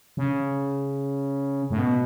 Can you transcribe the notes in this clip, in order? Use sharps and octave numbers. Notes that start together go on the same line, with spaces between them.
C#3
A2
B2